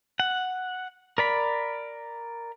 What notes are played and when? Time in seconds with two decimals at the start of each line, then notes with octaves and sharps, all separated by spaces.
0.20 F#5
1.18 A#4 D5 B5